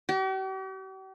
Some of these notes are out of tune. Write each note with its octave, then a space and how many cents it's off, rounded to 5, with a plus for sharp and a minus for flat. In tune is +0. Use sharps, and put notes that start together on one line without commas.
G4 -45